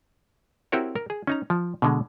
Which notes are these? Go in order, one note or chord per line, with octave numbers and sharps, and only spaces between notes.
C4 E4 F#4 G4 A#4 C#5
A#4
G#4
C#4 D#4 A#5
F3
B2 D3 G#3